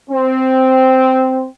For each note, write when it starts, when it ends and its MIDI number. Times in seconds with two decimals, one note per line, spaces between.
0.10 1.46 60